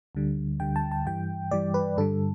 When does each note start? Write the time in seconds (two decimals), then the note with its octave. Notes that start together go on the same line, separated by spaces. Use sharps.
0.15 D2 D3 G3
0.60 D2 D3 G3 G5
0.76 A5
0.92 A5
1.06 G2 E3 G3 G5
1.51 G2 E3 G3 D5
1.74 B4
1.97 G2 D3 G3 A4